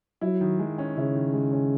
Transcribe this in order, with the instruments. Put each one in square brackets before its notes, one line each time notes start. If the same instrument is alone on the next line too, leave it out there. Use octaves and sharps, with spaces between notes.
[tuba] F#3 [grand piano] E4
[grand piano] D#3
G#3
C#4
[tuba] C#3 [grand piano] E4
[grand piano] D#3
G#3
C#4